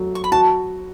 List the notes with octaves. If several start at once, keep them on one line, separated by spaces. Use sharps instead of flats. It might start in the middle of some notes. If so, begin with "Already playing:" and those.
Already playing: F#3 A3
C#6
B5
F#4 A5